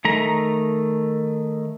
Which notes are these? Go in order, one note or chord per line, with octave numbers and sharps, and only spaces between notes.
D#3 A3 A#5